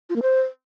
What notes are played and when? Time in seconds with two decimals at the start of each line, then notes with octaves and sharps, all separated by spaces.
0.10 F4
0.16 A#3
0.22 C5